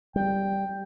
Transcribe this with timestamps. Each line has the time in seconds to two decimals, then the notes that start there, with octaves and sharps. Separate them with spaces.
0.16 G3 G5